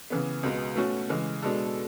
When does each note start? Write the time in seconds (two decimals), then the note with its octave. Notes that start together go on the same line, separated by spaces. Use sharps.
0.10 C#3 E3 B3
0.43 C#2 B2 G#3 B3
0.76 B2 A3 C#4 F#4
1.10 C#3 E3 G#3
1.43 B2 G#3 D4 A4